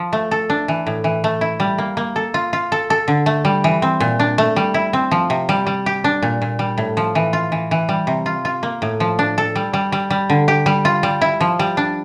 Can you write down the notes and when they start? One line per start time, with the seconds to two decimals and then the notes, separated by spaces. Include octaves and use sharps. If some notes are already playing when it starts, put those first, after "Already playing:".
Already playing: F3
0.13 A3
0.31 A4
0.50 D4
0.68 E3
0.87 A2
1.04 E3
1.24 A3
1.41 E4
1.60 G3
1.78 A#3
1.97 A#3
2.16 A4
2.34 F4
2.53 F4
2.72 A4
2.90 A4
3.08 D3
3.26 A3
3.45 G3
3.64 E3
3.82 C4
4.00 A#2
4.20 D4
4.38 A3
4.56 G3
4.74 E4
4.93 C4
5.11 F3
5.30 C3
5.49 G3
5.67 G3
5.86 G4
6.04 D4
6.22 A#2
6.42 A#2
6.59 G3
6.78 A2
6.97 F3
7.15 E3
7.33 F4
7.52 E3
7.71 E3
7.89 G3
8.07 C3
8.26 F4
8.45 F4
8.63 A#3
8.82 A2
9.00 F3
9.19 D4
9.38 A4
9.56 G3
9.73 G3
9.92 G3
10.10 G3
10.30 D3
10.48 G4
10.66 G3
10.85 F4
11.03 G3
11.21 E4
11.41 F3
11.59 G3
11.77 D4